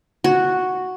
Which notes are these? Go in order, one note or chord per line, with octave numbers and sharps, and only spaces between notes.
F#4